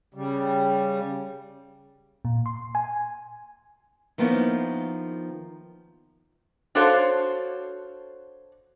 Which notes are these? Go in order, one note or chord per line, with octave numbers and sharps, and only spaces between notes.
C#3 G3
A#2
C6
G#5
D#3 F3 A#3 B3 C#4 E4
D4 F#4 A4 C5 C#5 F5